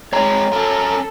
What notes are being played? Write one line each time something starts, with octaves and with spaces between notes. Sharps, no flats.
G#3 C4 C#5 A#5
C#4 A4 A#4